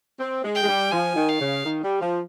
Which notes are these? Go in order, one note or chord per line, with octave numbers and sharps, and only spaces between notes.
C4
G#3
G5
G#3
G3
F3 G#5
D#3
F5
C#3
D#3
G3
F3